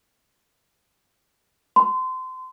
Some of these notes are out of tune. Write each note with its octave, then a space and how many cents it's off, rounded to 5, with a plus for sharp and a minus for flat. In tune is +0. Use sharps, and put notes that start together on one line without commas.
C6 -25